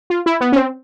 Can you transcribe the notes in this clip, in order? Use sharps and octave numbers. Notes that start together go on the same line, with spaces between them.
F4
E4
B3
C#4
C4